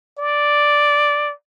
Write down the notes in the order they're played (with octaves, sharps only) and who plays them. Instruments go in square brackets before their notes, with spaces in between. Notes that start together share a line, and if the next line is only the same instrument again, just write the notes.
[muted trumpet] D5